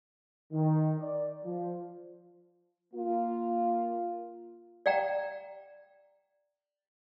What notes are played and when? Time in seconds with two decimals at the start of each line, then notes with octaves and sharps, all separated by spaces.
0.53 D#3
1.00 D5
1.45 F3
2.94 A#3 F4
4.86 D5 F5 G5 A#5